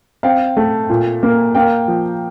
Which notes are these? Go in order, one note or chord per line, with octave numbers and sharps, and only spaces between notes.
C4 F5 G5
A3
A#2
A#3
A#3 F5 G5
F3